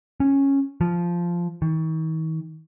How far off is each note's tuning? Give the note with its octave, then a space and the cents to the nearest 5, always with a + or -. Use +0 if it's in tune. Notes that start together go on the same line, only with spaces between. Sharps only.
C#4 -10
F3 -10
D#3 +45